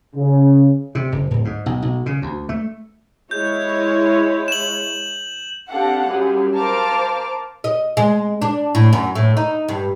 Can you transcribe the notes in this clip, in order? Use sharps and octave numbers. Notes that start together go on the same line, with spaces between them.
C#3
C3
F#1
D1
G#2
B1
B1
C#3
D2
A3
G#3 E4 C#5 G6
E7 F#7
C4 D4 G4 A4 F5 F#5
F#2 G3 G4 G#4
A#4 C5 F5 A5 D6 F6
D#5
G#3
D4
A2
F#2
A2
D#4
G2